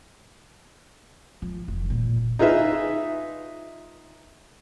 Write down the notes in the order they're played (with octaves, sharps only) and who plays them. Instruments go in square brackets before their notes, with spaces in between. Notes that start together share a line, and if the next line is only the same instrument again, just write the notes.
[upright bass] F3
F1
A#2
[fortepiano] D#4 F4 G#4 B4 E5